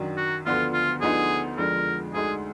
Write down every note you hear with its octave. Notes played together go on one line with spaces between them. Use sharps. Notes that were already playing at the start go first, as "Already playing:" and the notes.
Already playing: F#2 D#3 F#3 D4
F#4
D2 D3 F3 B3 F4
F4
D2 D3 F3 B3 D#4 G#4
F2 D3 F3 G#3 D4 A#4
D2 D3 G#3 D#4 G#4